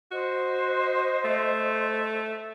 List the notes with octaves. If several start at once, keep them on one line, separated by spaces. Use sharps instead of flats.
F#4 C5 D#5
A3